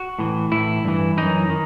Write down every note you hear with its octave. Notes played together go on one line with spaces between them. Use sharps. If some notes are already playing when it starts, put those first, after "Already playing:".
Already playing: F#4
A2 E3
A2 E3 E4
G2 E3
F#2 E3 D#4
D#3